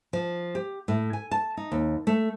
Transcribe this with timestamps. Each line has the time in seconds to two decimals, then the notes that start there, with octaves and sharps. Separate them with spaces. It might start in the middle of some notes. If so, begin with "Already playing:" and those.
0.13 F3
0.55 G4
0.88 A2
1.13 G#5
1.31 A5
1.57 D#4
1.72 D#2
2.07 A3